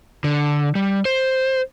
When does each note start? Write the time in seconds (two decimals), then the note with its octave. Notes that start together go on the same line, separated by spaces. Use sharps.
0.24 D3
0.75 G3
1.05 C5